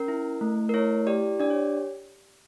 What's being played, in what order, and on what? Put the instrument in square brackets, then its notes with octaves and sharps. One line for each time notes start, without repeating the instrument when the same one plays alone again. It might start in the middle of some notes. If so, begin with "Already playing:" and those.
Already playing: [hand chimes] C#4 A#4
E4
A3
A#4
E4 C#5
G4 D5
D4 D5
C#5